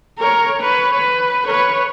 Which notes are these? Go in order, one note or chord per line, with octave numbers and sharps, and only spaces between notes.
A#4 C#5
B4 C#5
B4
B4 C#5